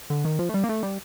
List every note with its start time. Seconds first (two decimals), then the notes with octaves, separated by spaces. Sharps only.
0.10 D3
0.25 D#3
0.39 F3
0.49 A3
0.54 G3
0.64 A#3
0.69 A3
0.83 G3